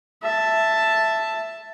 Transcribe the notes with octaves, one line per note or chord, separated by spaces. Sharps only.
E5 A5